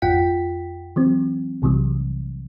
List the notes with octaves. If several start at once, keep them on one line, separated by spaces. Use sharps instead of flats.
G#1 F2 F4 F#5 G5 B6
E3 F#3 C4
B1 C3 E3 F#3 G3